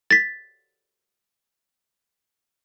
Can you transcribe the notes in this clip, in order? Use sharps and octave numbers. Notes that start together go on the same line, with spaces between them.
A6 B6